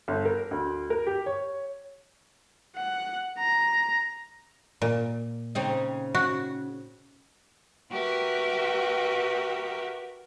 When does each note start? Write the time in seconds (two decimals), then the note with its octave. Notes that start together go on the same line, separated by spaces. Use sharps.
0.08 G1
0.25 A#4
0.51 D2
0.90 A#4
1.07 G4
1.26 C#5
2.76 F#5
3.39 A#5
4.82 A#2
5.55 C#3 C4 D#4
6.15 F#4
7.92 F#4 G4 A#4 B4 E5 G5